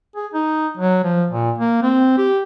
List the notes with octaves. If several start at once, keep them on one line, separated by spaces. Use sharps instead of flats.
G#4
D#4
F#3
F3
A#2
A#3
C4
G4